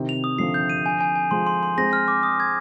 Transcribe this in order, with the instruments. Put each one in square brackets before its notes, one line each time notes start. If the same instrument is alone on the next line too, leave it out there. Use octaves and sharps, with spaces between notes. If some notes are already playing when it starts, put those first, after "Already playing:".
Already playing: [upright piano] C3 D#3
[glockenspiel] F7
D#6
[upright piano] D3 F3 [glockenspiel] C7
[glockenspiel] G6
D#7
G#5
G#5
G#5
[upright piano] F3 G#3 [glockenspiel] C6
[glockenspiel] C6
C6
[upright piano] G#3 C4 [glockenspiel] A#6
[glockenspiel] F6
D6
D#6
G#6